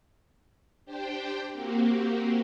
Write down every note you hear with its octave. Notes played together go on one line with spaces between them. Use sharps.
D4 G4 C5 G5
A#3 C4 F#4 G4